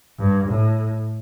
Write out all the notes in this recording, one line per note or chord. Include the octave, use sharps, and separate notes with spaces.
G2
A2